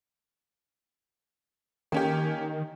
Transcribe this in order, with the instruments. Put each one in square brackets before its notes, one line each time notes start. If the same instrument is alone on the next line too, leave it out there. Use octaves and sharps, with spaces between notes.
[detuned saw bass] D#3 [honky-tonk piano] A#3 C#4 G4